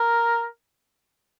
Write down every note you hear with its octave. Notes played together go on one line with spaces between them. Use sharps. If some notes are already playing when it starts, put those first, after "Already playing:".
Already playing: A#4